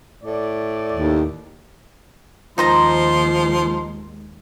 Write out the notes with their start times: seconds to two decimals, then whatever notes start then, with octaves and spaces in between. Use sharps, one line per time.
0.23 A2 D5
0.92 D#2
2.58 D#2 D#3 F3 G#3 D#4 C5 A#5 C6